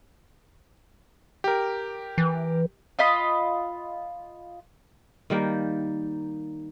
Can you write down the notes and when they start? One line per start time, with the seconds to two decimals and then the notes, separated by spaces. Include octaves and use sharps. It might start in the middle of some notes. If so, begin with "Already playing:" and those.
1.44 G4 A#4
2.18 E3
2.99 F4 D#5 B5
5.30 D#3 G3 A#3